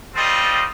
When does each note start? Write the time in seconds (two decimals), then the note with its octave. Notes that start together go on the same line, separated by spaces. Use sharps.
0.14 G3 C4 F4 A4 D#5